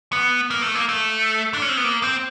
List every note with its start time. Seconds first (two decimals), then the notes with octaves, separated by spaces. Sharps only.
0.13 B3
0.50 A#3
0.63 A3
0.75 A#3
0.89 A3
1.54 D4
1.62 C#4
1.69 C4
1.77 B3
1.84 A#3
2.03 C4